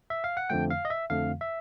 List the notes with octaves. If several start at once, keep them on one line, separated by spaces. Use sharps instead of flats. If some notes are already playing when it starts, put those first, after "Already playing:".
E5
F5
F#5
F2 D3 F3 A3 G5
F5
D#5
E5
F2 D3 F3 A3 F5
E5